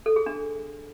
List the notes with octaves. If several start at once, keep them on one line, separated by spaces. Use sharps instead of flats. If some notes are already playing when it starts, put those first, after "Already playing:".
A4
G#4
D4